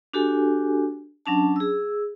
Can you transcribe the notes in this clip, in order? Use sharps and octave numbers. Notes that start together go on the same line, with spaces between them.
D4 F#4 G4 A4 G#5
F#3 C#4 D4 A5
G#4 E6